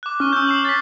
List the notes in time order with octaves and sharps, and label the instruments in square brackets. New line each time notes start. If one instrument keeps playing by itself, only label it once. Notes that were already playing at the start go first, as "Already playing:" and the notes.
[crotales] D6 F#6
[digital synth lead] C#4 [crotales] C#6 F6
[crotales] E6 G6
C7 E7 F#7
A6 B6